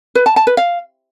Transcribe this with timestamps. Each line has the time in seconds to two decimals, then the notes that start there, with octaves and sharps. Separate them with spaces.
0.15 B4
0.26 A5
0.36 A5
0.47 B4
0.57 F5